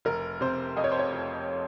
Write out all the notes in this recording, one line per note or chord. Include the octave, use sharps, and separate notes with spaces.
F1 A#4
C3 C5
F2 D#5
C#5
C5
C#5
F1